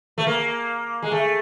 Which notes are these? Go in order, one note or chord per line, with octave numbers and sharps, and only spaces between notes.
A3
A#3
G#3
A3